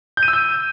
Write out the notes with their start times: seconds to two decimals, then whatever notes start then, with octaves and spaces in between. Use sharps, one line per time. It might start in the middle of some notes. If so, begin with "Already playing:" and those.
0.17 G6
0.23 D#7
0.28 E6
0.33 G6